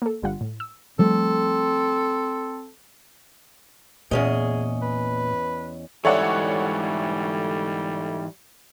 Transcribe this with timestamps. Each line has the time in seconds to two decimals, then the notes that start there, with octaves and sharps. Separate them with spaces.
0.02 A#3 A4
0.22 G1 D3 G3 F4 F#5
0.41 A2
0.60 E6
0.99 F3 G3 A3 C4 A4
4.11 E2 A#2 C#4 G#4 D#5
4.82 B4
6.05 G#2 E3 G3 A4 C#5 D5 E5 F#5